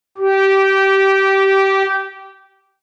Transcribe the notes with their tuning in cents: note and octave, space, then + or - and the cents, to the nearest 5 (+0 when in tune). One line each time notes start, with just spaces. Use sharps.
G4 -20